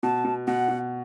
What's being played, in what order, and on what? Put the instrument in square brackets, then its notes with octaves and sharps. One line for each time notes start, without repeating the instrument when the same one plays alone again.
[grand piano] B2 [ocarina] A5
[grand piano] B2
[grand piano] B2 [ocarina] F#5
[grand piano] B2